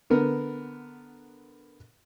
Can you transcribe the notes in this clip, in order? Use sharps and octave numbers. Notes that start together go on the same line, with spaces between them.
D3 B3 A#4